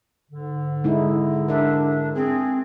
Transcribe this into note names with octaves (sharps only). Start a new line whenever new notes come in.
G#2 D3
G#3 D#4 E4
D4 A#4 E5
C4 G#4